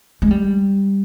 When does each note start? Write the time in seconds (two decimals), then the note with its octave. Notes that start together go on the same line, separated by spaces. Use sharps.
0.22 G#3
0.31 G3